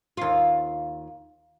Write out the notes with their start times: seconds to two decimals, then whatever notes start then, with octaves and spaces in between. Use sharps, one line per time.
0.17 D#2 F4